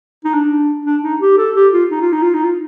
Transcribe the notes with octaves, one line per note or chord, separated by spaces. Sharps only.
D#4
D4
D4
D#4
G4
A4
G4
F4
D#4
F4
D#4
F4
D#4
F4